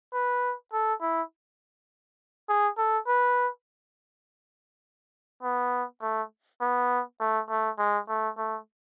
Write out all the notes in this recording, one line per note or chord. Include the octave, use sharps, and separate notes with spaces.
B4
A4
E4
G#4
A4
B4
B3
A3
B3
A3
A3
G#3
A3
A3